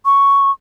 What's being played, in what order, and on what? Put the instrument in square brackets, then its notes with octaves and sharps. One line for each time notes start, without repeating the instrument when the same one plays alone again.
[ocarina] C#6